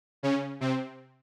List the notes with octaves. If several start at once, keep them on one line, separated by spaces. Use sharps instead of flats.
C#3 C#4
C3 C4